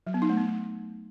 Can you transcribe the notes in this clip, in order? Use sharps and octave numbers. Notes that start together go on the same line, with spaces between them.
F#3
B3
D#4
A3
B3